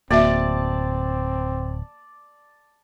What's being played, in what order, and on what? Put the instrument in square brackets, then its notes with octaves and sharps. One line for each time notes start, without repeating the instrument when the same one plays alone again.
[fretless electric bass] D1 [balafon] A#3 F#4 E5 [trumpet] C4 [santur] D5 A5